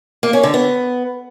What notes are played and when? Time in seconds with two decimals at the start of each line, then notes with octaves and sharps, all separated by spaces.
0.23 A#3
0.33 C#4
0.43 D3
0.54 B3